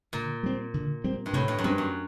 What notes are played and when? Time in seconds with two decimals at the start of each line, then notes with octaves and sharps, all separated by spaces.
0.13 A#2 D3
0.43 G3 C4
0.74 D3
1.04 G3 C4
1.26 G2
1.33 A2 C3
1.48 G2
1.58 F#2
1.64 G2 G3 C4
1.78 F#2